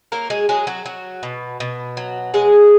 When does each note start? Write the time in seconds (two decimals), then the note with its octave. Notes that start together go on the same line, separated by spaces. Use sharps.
0.12 F#3 A#3 A#4
0.30 G#3 G#4
0.49 F#3 G#3 G#4
0.67 F#3 F#4
0.86 F#3
1.23 B2
1.60 B2
1.97 F#3
2.34 F#3 G#3 G#4